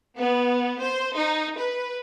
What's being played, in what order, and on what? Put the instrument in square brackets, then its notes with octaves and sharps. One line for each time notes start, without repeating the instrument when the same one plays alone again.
[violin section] B3
C5
D#4
B4